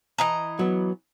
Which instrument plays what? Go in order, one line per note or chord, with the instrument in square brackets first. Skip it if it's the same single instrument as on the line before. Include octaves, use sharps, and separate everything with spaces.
[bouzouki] E3 D#5 A#5
[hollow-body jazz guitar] F#3 B3